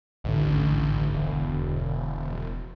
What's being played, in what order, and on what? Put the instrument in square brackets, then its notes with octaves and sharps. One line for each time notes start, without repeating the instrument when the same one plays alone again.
[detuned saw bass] A1 [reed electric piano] D2 G#2 D3
[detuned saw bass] E1